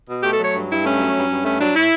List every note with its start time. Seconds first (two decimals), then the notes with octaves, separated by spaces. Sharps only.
0.08 B2
0.23 A3 G4
0.33 A4
0.39 F#3 C#5
0.53 G2
0.68 G2 E4
0.84 A3 C#4
0.99 F#3
1.15 G2
1.29 G2
1.45 A3 C#4
1.60 F#3 D4
1.75 A2 E4